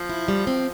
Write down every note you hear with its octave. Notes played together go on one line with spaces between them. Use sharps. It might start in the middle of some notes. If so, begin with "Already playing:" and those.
Already playing: F3
E4
G3
C4